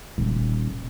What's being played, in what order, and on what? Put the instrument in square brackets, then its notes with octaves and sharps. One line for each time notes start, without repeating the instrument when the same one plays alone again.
[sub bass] D#1